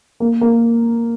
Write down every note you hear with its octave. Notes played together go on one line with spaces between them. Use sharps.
A#3
A#3